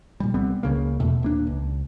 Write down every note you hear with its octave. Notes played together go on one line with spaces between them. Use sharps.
A#2 G3
C2 G3 B3 C4
C#2 C#3 A#3
F1 E2 B2 A3
D#1 A#3 D4
C#2